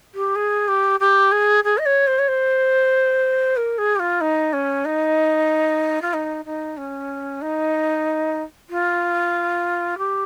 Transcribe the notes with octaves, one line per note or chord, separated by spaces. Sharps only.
G4
G#4
G4
G4
G#4
G#4
D#5
C#5
C5
C#5
C5
A#4
G#4
G4
F4
D#4
C#4
D#4
F4
D#4
D#4
C#4
D#4
F4
G4